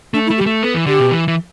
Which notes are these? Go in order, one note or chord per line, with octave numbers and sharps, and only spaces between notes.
A3 D4
E4
A3
G4
G3
A3
B3 A4
E3
D3 G4
B2
E3
E3